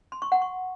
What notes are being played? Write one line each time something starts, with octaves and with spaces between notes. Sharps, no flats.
C6
C#6
F#5
C#6